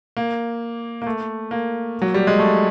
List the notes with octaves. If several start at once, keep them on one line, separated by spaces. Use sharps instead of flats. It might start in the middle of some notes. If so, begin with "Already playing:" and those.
A#3
A#3
A3
A#3
F#3
G3
G#3
A3